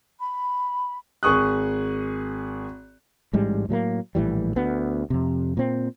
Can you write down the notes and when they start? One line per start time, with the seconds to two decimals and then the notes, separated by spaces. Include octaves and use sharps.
0.20 B5
1.23 G#1 G#4 C#6 D#6 F#6
3.33 A1 G#2 G3 G#3
3.69 A2 F#3 G#3 A#3
4.15 A#1 A2 E3 G3
4.56 D2 B3
5.10 F2 C3
5.57 A#2 C4